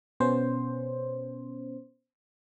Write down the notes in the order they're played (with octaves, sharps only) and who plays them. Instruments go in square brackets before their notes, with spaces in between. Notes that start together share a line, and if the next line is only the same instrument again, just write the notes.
[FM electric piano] B2 B3 C#4 C5